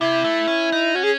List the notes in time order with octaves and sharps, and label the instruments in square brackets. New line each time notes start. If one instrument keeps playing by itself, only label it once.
[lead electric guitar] C3 [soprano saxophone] E4
[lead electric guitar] A3
C#4
D#4
[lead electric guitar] C#4 [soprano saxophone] F#4
[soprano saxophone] G#4